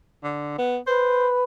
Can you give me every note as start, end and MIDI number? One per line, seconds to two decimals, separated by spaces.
0.23 0.54 50
0.58 0.78 59
0.87 1.44 71
0.87 1.29 72